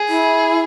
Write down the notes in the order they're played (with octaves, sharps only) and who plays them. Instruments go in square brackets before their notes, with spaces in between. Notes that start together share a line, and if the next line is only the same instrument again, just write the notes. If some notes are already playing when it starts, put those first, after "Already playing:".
Already playing: [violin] G#4
[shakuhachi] E4